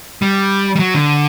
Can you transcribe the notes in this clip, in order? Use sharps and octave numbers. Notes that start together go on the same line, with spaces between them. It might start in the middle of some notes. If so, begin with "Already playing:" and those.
G3
G3
F#3
D3